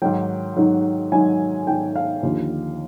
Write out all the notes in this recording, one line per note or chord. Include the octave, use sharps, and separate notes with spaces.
G#2 D#3 F#3 G5
G#2 D#3 F#3
G#2 D#3 F#3 G#5
G#2 D#3 F#3 G5
F5
D#2 D3 F3